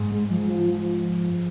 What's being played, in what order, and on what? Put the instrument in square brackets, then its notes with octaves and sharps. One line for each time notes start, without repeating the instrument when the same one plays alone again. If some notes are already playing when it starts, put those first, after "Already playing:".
Already playing: [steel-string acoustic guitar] G#2
[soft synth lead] G#3
F3
F3
F3